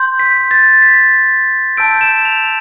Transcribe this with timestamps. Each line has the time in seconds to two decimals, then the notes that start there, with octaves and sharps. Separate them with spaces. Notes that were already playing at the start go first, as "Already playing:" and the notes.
Already playing: C6 G6
0.19 B6
0.51 A6
0.82 B6
1.77 A5 E6 G6 D7
2.01 E7
2.25 F7